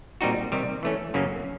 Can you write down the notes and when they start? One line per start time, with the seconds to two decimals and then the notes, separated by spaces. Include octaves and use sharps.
0.21 A#2 G3 C4 D#4 F#4
0.52 C3 D#3 G3
0.83 E3 A3 C#4
1.14 F#2 C#3 F#3 A#3 C#4